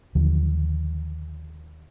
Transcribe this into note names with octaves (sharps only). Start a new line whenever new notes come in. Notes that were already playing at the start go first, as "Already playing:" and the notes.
D#2 D3 F3 F#3